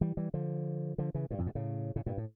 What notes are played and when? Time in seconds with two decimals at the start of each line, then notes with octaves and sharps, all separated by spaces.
0.01 E3 G3
0.17 E3 G3
0.34 D3 F3
0.98 D3 F3
1.14 C#3 E3
1.31 G2 A#2
1.38 F2 A2
1.46 G2 A#2
1.55 A2 C#3
1.96 A2 C#3
2.06 G2 A#2
2.18 A2